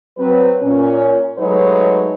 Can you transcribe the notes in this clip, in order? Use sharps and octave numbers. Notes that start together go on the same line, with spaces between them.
F#3 C4 B4
A#2 C#4
F#3 G#3 A3 D#4 B4 C#5